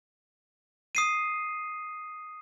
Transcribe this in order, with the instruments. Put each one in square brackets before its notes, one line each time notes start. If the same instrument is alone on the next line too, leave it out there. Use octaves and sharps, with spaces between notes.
[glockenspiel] D#6 C7 D#7